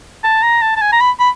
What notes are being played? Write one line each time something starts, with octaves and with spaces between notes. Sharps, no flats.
A5
A#5
A5
A5
G#5
A#5
B5
B5